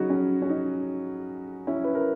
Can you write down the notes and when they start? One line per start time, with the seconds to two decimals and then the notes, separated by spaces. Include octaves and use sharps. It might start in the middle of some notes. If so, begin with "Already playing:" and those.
Already playing: C#3 F#3 D#4 F#4
0.10 C#4
0.42 C#4
0.50 D#4
1.67 C#4 E4
1.84 B4
1.95 A#4